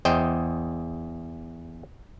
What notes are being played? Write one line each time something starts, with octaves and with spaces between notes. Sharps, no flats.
E2 C5 D#5 G5